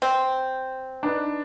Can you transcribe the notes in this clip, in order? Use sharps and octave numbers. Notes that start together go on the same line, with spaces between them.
C4
D4 D#4 B4